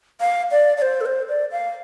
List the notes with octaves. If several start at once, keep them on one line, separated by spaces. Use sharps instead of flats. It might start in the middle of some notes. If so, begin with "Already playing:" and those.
F5
D5
D5
C5
A4
C5
D5
F5